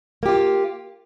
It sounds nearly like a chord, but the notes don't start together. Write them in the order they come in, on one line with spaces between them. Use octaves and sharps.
A#3 G4 F4